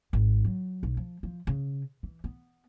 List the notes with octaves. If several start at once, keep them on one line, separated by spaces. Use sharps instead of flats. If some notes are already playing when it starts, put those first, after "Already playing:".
G#1
F#3
B1
F3
F3
C#3
E3
B3